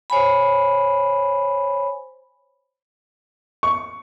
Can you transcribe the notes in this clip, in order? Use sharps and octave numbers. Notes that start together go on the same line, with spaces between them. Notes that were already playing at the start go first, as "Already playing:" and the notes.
C5 C#5 G#5 B5
C#6